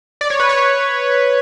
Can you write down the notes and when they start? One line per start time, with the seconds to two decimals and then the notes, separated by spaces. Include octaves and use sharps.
0.21 D5
0.30 C#5
0.40 B4
0.49 C#5